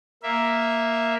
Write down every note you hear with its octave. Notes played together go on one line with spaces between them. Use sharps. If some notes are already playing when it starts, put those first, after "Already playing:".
A#3 E5